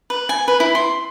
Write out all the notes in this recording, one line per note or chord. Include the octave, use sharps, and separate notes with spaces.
B4
G#5
B4
E4
C6